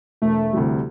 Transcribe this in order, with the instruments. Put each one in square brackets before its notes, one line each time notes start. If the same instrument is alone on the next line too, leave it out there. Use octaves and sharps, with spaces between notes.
[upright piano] E1 [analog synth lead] A3
[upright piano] D2 C3 E3 G3